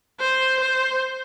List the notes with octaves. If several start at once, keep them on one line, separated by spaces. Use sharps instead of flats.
C5
C5